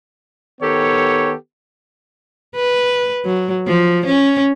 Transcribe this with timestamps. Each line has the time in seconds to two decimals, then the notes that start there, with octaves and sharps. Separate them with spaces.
0.61 D#3 B3 G4 A4 C#5
2.56 B4
3.26 F#3
3.67 F3
4.06 C#4